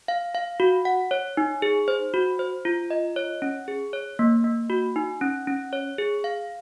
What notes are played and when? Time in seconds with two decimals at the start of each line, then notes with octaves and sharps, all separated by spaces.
0.08 F5
0.35 F5
0.60 F#4
0.85 F#5
1.11 C#5
1.37 D#4
1.62 G#4
1.88 C5
2.14 F#4
2.39 C5
2.65 F4
2.90 D#5
3.16 C#5
3.42 C#4
3.68 G#4
3.93 C#5
4.19 A#3
4.44 A#3
4.70 F#4
4.96 D#4
5.21 C#4
5.47 C#4
5.73 C#5
5.98 G#4
6.24 F5